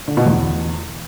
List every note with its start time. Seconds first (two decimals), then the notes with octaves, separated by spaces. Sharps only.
0.08 D3
0.17 B2
0.26 E2